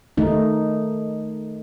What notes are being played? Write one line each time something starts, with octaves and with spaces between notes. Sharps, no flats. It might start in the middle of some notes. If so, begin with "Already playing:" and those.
D#3 A3 D#4